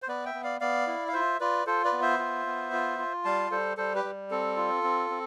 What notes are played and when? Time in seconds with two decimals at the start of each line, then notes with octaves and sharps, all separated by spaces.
0.02 C5
0.08 B3 B4 D5
0.25 E5 G5
0.34 B3
0.43 D5 F5
0.60 B3 D5 F5
0.87 E4
1.08 F5
1.13 F4 C5 E5
1.40 F4 B4 D5
1.66 F4 A4 C5
1.84 B4 D5
1.92 B3
2.02 C5 E5
2.19 F4
2.46 B3
2.73 F4
2.99 F4
3.25 G3 F5 A5
3.51 G3 A4 C5
3.77 G3 A4 C5
3.95 G4 B4
4.04 G3
4.30 C4 A4
4.56 F4
4.83 C4
5.10 C4